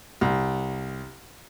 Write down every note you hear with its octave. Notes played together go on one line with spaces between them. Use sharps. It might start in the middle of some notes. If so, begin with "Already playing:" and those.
C2